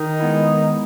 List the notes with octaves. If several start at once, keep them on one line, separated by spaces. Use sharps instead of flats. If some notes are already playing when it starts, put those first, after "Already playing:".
Already playing: D#3 D#4
G#3 B3 E4